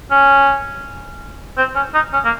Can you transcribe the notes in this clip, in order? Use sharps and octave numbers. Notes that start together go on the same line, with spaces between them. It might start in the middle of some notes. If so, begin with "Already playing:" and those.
C#4
C4
C#4
D#4
C#4
A#3